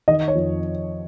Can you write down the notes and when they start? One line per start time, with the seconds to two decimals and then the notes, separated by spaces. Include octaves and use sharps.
0.08 D#3 D#5
0.28 C#5
0.35 F2